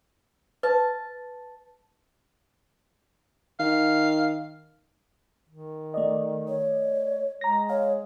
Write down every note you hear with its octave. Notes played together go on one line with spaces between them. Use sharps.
B4 A5
D#3 F5
D#3
A3 D5 D#5
C#5
G#3 A#5 A#6
C#5 F5